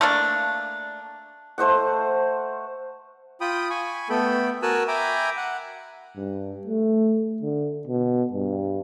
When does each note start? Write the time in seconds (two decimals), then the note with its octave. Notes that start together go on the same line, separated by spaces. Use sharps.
0.01 A3 A#3 D4
1.58 A3 C5 D#5 F#5
3.41 F4 G5 B5 D#6
3.70 G#5 B5 C#6
4.09 A3 B3 A4 G5 B5
4.62 F#4 A#4 G#5 A5 E6 F#6
4.88 E5 G5 G#5 A#5 B5 D6
5.37 F#5
6.16 G2
6.67 A3
7.42 D3
7.87 B2
8.33 G2